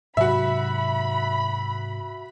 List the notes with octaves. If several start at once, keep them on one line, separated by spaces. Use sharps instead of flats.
G#2 C3 F#3 F#4 E5 B5